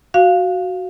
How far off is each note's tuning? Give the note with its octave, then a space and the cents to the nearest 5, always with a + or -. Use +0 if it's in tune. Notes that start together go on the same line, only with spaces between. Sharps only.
F#4 +0 F5 +0